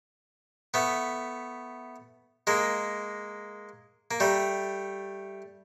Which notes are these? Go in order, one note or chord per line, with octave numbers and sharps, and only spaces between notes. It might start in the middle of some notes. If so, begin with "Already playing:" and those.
A3 B3
G#3 A#3
A#3
G3 A3